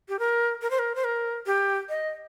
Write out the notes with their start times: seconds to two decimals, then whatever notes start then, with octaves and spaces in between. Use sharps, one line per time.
0.09 G4
0.19 A#4
0.62 A#4
0.70 C5
0.79 A#4
0.95 C5
1.04 A#4
1.46 G4
1.89 D#5